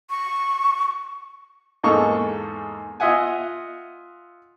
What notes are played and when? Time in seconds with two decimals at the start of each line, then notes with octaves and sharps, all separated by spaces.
0.10 C#6
1.83 E2 G#2 A#3 D#4 A4 C#6
3.00 F4 D#5 E5 F#5 G#5